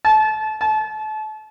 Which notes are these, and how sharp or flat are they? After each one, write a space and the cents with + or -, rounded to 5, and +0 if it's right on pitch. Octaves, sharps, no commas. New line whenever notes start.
A5 -25
A5 -30